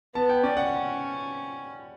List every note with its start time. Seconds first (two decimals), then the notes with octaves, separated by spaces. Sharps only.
0.15 B3 A5
0.29 G5
0.43 C#4 D5
0.57 F#5